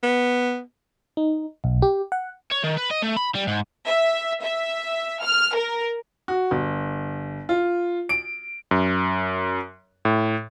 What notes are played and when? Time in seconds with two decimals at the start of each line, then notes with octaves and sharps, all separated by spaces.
0.03 B3
1.17 D#4
1.64 B1
1.82 G4
2.12 F#5
2.51 C#5
2.63 D#3
2.77 B4
2.91 D#5
3.02 A3
3.17 B5
3.35 G3
3.47 G#2
3.86 E5
4.42 E5
5.23 F6
5.54 A#4
6.28 F#4
6.51 G1
7.49 F4
8.09 D7
8.71 F#2
10.05 A2